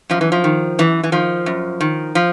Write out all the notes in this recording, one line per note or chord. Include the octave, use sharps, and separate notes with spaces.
F#2 F3
E3
F3
D#3
F#2 E3
E3
D#3 F3
F#2
D#3
F3